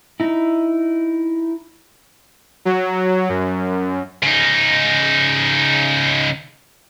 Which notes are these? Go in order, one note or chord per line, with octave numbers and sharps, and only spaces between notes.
D#4 E4
F#3
F#2
C#3 D#4